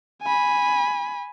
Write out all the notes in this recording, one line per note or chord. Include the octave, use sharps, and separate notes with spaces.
G#5 B5